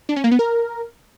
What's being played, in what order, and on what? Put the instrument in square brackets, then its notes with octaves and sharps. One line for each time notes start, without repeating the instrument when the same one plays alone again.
[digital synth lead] D4
C#4
A#3
B3
A#4